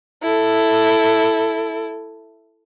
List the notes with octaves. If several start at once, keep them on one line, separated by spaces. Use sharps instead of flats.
E4 A4